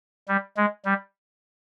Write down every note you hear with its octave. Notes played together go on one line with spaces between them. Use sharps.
G3
G#3
G3